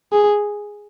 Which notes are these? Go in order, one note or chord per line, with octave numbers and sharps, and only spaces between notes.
G#4